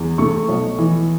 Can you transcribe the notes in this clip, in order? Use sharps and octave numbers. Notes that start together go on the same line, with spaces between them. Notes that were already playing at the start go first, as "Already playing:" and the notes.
Already playing: E2
A3 C#6
B1
E3